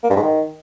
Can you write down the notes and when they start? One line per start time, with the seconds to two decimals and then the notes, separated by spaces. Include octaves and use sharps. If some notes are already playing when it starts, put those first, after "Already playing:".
0.04 A#3
0.10 G2
0.16 G#2
0.22 D#3